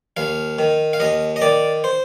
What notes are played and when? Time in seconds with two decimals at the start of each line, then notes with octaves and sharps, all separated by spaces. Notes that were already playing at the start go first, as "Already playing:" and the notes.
0.17 D#2 F5
0.59 D#3
0.93 F5
1.00 D#2 D#5
1.36 D#5
1.42 D#3 D5
1.84 C5